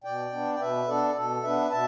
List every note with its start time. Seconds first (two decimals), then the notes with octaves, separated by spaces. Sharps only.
0.04 B2 D5 G5
0.32 B3 D4
0.54 G5
0.60 B2 B4 E5
0.88 B3 D4 A4 D5
1.16 B2 A4
1.43 B3 D4 B4 E5
1.71 B2 E5 A5